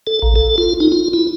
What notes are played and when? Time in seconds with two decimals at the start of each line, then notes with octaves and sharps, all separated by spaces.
0.07 A4
0.22 A#1
0.36 A4
0.58 F4
0.80 D#4
0.92 F4
1.13 E4